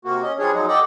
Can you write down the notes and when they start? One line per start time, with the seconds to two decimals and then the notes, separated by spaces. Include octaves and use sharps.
0.05 C3 A#3 F#4
0.23 C#4 D#5
0.39 F3 G3 D4 G#4 C#5
0.54 F3 F#3 G#3 D#4
0.68 G4 A4 D5 D#5 F#5 G5